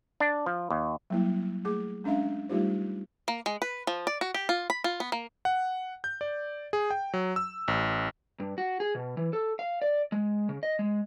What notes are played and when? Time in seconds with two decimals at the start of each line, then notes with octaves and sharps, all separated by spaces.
0.20 D4
0.46 F3
0.70 D#2
1.10 F#3 G3 A#3 E4
1.65 A3 G#4 D6
2.04 G#3 C#4 D4 E5 F5
2.49 G3 A3 D#4 F4 G4 C5
3.28 A#3
3.46 G#3
3.62 B4
3.87 F3
4.07 D5
4.21 F#4
4.34 G4
4.49 F4
4.70 B5
4.84 F4
5.00 B3
5.12 A#3
5.45 F#5
6.04 G6
6.21 D5
6.73 G#4
6.91 G5
7.14 F#3
7.36 E6
7.68 A1
8.40 G2
8.58 F#4
8.80 G#4
8.95 B2
9.17 E3
9.33 A4
9.59 F5
9.82 D5
10.12 G#3
10.49 C#3
10.63 D#5
10.79 G#3